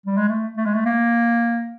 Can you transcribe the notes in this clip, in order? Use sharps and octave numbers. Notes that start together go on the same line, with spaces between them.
G3
G#3
A3
A3
G#3
A3
A#3